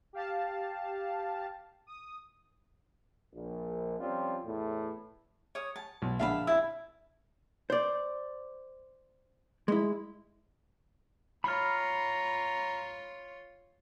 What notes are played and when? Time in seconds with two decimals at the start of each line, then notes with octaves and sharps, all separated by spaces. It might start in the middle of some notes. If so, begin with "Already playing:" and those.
0.13 G4 F5 A5
1.87 D#6
3.33 A#1
4.00 F3 G3 C4 C#4 F4
4.45 E2 A2
5.55 C#5 D#6
5.76 A5
6.02 B1
6.19 A#1 D3 E5 F5 A5 B5
6.47 E4 A5 E6
7.70 C5 D5
9.68 G#3 E4
11.44 F4 C#5 A#5 B5 F6